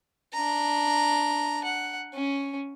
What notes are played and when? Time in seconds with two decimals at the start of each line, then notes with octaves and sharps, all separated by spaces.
0.33 D4 A#5
1.64 F#5
2.13 C#4